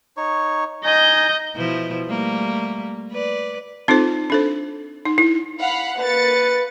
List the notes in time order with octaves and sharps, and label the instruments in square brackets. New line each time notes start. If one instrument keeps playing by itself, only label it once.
[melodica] D#4 C#5 C#6
[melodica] D#4 G#5 [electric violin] D#5 G6
[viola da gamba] B2 F3 E4
G3 A3 A#3
B4 D5
[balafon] C4 D#4 F4 A4 C5
D4 A4 C5
D#4
E4
[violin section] F5 F#5 B5
[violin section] A#3 A6 C#7 [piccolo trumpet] B4